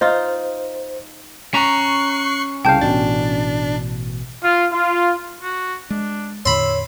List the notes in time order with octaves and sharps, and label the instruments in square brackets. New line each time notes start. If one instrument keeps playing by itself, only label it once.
[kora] D#4 F4 [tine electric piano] C5
[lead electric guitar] C#4 A#5 [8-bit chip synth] C#6 F#6 C7
[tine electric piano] C2 C#3 F5 [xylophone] G5 A5 G6
[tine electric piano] A1 B2 A6 [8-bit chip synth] D4
[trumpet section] F4
F4
[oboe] F#4
[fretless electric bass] G#3 [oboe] D4
[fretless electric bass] E2 A2 D3 [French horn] C#5 [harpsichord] B5 C6 [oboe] E6